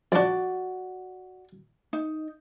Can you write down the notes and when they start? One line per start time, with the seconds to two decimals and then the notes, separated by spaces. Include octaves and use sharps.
0.12 F2 D4 F#4 D5
1.93 D#4